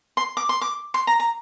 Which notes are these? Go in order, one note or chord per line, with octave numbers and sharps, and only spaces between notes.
C6
D6
C6
D6
C6
A#5
A#5